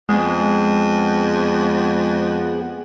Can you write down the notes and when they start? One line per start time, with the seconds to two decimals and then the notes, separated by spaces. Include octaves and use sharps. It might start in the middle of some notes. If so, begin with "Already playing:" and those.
0.09 F2 G#3 B3 G#4 F#5